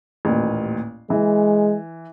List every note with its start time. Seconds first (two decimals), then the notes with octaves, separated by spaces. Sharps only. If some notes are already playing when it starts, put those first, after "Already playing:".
0.25 A1 D#2 A#2
1.10 E3 G#3